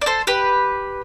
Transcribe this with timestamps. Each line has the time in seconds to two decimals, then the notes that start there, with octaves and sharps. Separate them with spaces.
0.01 D5
0.06 A4 C5
0.27 G4 B4